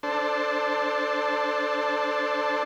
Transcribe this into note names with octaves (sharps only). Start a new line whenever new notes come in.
D4 A4 C5